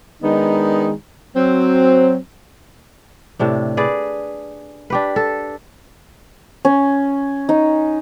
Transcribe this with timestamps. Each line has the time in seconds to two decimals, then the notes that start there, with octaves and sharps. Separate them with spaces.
0.22 D#3 G#3 B3 D4 D#4
1.35 F#3 C4
3.39 A2 C3 D4
3.77 G#4 B4 D5
4.90 D4 G4 B4
5.16 A4
6.65 C#4
7.49 D#4